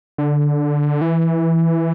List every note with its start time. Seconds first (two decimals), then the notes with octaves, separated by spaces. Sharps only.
0.18 D3
1.01 E3